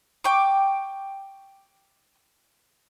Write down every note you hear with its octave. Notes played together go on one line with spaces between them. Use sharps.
G5 C#6 D6